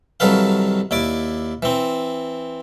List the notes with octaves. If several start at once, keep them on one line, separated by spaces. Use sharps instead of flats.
C2 D#3 F#3 A4 B4 F5
D#2 E4 D5 D6
E3 C4